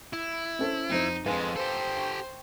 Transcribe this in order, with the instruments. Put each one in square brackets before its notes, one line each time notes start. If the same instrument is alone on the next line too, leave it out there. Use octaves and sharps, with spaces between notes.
[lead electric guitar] E4
[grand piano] C#4 A4 C5
[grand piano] F2 F3 C5 [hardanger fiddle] D#4
[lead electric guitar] F2 G#2 [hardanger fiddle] G#3 [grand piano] B4 F5 G#5
[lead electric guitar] G4 A4 [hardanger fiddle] C5
[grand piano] G5 C#6